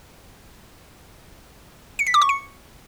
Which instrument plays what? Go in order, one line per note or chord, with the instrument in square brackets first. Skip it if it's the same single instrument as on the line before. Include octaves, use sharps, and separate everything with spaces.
[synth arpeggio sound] C#7
B6
D6
C#6
C#7